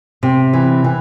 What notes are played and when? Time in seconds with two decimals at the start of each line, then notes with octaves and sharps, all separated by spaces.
0.23 C3
0.53 E3
0.84 E3